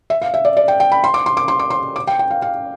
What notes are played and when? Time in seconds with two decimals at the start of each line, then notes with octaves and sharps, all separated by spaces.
0.10 E5
0.22 F5
0.34 E5
0.45 D5
0.57 D5
0.68 G5
0.80 G5
0.92 B5
1.04 C6
1.14 D6
1.26 C6
1.37 D6
1.48 C6
1.59 D6
1.70 C6
1.96 D6
2.07 G5
2.19 G5
2.30 F5
2.42 F5